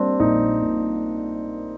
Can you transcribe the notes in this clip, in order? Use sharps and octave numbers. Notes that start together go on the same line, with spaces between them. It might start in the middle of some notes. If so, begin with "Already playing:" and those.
Already playing: G3 A#3 C4 D4
A#1 D#4
A#2